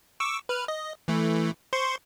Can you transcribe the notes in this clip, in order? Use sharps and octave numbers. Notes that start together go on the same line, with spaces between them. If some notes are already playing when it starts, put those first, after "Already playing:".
C#6 D6 E6
B4 F6
D#5
E3 A3
C5 C6 C#6